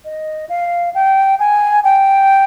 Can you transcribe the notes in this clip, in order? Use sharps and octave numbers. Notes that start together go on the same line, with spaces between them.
D#5
F5
G5
G#5
G5